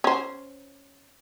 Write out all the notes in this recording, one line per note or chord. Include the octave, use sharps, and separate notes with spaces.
C#4 C5